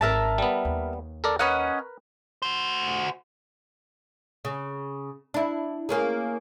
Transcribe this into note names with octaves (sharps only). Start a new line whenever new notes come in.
G#1 A#4 E5 A5
G3 B3
D#2
A4 A#4 D5
C#4 A#4 B4 D#5 F#5
F#4 C5
C#3
D4 E4
A#3 C#4 G#4